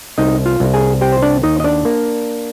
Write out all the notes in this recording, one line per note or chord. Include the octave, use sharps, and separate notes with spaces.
C2 D#4 D#5
F4 F5
C2
G#4 G#5
C4 G4 G5
C5
D4 D5
D#2 D#4 D#5
D#5
D4 D5
A#3